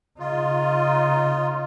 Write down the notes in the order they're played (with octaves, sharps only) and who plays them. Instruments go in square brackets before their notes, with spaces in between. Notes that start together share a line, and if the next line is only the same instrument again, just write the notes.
[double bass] C#3 D#4 [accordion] F4